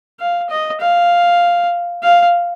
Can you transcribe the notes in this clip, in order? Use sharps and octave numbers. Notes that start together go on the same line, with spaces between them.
F5
D#5
F5
F5